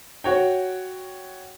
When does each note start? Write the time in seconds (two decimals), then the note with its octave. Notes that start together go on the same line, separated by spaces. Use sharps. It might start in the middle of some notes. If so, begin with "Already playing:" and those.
0.24 F#4 C#5 G5